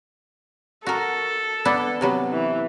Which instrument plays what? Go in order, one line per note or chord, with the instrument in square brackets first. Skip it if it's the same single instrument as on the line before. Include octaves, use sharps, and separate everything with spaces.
[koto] F#4 A#4 [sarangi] A4
[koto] B3 D4 E4
C3 F#3 B3
[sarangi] E3